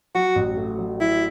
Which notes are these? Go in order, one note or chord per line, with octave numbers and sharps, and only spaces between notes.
F#3 F#4
A1
A3
F#3
F#3 E4